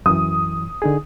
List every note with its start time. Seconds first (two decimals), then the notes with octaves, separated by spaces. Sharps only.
0.06 F#2 E3 D#6
0.82 D3 D#4 G#4